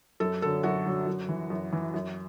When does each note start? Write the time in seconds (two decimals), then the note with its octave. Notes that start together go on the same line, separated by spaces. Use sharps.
0.20 F#2 A4
0.42 D3 F#3 A4
0.63 F#2 F#4
0.85 D3 F#3
1.07 F#2
1.29 E3
1.50 F#2
1.72 E3
1.94 F#2